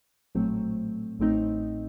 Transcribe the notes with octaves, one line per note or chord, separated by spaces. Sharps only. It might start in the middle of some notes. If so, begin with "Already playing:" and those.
A#1 A2 F#3 A3 C4
A1 A2 A3 C4 D#4